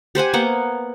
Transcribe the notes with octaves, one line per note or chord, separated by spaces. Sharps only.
G4 C5 F#5 G#5
A#3 B3 F#5